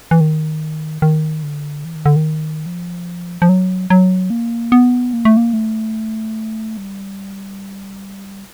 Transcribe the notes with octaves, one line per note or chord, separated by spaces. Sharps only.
E3
D#3
D#3
D3
E3
D#3
D3
D#3
F3
F3
F#3
F#3
A#3
B3
A#3
A3
A#3
A3
G3